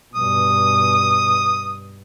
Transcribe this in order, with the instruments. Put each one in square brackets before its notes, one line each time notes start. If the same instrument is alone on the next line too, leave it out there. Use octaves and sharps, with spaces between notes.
[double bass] G2 B2 [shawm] D#6